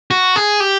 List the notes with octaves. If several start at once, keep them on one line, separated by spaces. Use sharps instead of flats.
F#4
G#4
G4